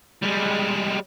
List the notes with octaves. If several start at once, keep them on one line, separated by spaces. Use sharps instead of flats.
G3 G#3